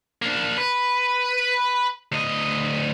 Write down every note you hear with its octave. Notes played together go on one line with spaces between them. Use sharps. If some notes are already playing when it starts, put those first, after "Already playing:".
A#3 D4
B4
D2 D#5